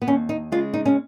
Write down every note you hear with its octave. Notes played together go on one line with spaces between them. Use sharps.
B3
D#2 C#4
D#4
C#3 G#3 F4
D#4
C#4